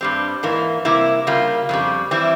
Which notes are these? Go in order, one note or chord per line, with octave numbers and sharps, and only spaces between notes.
G2 G3 C4
G#2 E3 A#3
C3 G3 A#3 E4
C#3 G3 A#3 F4
F2 C#3 G3
E3 G3 C4 E4